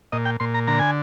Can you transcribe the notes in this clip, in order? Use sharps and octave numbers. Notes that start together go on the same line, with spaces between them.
A#2 D#5
G5
A#2 C6
A#5
D3 A#5
G#5